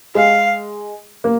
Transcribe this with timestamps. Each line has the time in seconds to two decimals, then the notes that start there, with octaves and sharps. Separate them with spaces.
0.15 G#3 F5
1.24 A#3